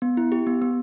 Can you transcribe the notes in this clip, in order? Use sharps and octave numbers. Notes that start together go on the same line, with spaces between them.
B3
E4
G4
B3
B3